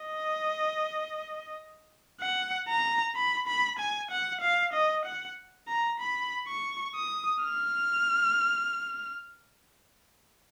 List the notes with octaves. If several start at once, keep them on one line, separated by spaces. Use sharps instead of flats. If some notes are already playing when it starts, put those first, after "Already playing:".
Already playing: D#5
F#5
A#5
B5
B5
G#5
F#5
F5
D#5
F#5
A#5
B5
C#6
D#6
F6